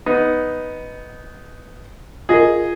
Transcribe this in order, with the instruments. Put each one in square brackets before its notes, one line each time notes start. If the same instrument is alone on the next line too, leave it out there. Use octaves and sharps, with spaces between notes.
[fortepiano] B3 D#4
[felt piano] F4 A#4 [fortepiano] G#4 D#5